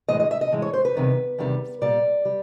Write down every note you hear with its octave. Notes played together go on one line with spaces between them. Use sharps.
A2 E3 G#3 D#5
D#5
E5
D#5
A2 E3 G#3
C#5
C5
B4
E2 C3 D#3 G3
E2 C3 D#3 G3
A#2 G3 D5
G3